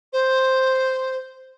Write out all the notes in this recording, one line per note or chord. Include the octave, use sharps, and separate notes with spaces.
C5